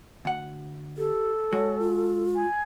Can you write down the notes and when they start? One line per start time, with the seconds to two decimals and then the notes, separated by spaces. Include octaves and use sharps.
0.25 D2 F#5
0.98 G4 A4
1.53 G#3 F#4 C#5
1.80 F4
2.36 G#5